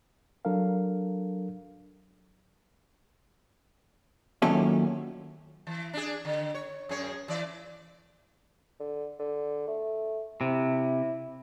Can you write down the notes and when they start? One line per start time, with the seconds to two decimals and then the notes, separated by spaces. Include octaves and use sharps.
0.45 F#3 D4 A4 A#4 F5
4.42 D#2 A#2 F#3 C#4 A4 E5
5.67 E3
5.93 D4 G#4
6.25 D3
6.55 C#5
6.89 F#2 G#4 C#5
7.28 E3 D5
8.80 D3
9.19 D3
9.68 A3
10.41 C3 E4